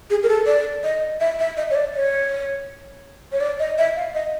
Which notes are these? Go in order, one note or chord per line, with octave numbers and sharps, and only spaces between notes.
G#4
A#4
A4
D5
D#5
E5
E5
D#5
C#5
D5
C#5
C#5
D5
D#5
E5
F5
D#5